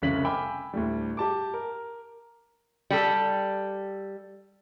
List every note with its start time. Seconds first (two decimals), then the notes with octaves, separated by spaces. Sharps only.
0.02 F1 C2 C#3 C#4 B6 F#7
0.25 G5 G#5 B5 D6 E6
0.73 D2 A2 G3
1.17 G4 A5 D6
1.54 A#4
2.90 G3 G4 A4